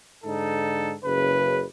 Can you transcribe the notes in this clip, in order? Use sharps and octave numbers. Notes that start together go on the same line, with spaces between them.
G#2 D3 D#4 A4
F#1 C#3 B4